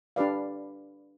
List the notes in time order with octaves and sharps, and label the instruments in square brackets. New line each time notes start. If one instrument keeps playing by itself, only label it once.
[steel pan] D4 G4 B4 D5 F5